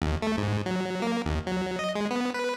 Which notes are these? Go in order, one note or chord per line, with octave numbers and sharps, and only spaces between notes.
D#2
A3
G#2
F#3
A#3
D#2
F#3
D#5
G#3
B3
B4